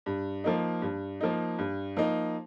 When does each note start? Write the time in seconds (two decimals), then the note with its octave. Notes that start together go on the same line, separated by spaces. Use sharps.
0.06 G2
0.44 F3 A#3 D#4
0.82 G2
1.21 F3 A#3 D#4
1.59 G2
1.97 F3 A#3 D#4